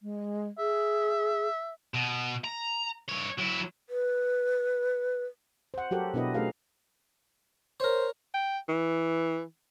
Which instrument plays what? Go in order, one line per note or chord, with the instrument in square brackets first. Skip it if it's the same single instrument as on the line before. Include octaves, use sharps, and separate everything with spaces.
[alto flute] G#3
[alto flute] G#4 [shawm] E5
[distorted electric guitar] B2
A#5
G2 C#5
F#3 E4
[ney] B4
[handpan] C5 F#5
F#3 F#4 G4 A4 A#4
B2 B3 D4 E4 B4 D#5
A3 C#4 G4 G#4 A#4 F5
[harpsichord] A#4 C#5 [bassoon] C5
[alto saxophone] G5
E3